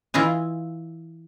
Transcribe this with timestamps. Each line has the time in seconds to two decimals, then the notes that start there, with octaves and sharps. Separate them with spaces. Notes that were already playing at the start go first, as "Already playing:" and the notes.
0.14 E3 E4 F4 D#5 G#5